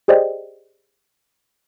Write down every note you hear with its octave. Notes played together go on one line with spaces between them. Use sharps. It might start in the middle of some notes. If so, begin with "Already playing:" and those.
G4 G#4 C5 D5 D#5 G5